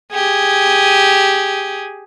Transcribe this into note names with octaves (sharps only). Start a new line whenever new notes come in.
G4 G#4